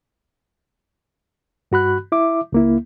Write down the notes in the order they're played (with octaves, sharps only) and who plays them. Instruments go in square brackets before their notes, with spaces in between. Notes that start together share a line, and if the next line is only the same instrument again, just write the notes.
[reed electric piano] G2 F#4 B5 F#6
E4 E5 D6
C#2 A#3 E4